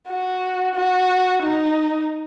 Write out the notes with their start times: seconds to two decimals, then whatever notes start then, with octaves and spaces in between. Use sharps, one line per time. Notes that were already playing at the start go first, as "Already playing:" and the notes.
0.08 F#4
0.75 F#4
1.43 D#4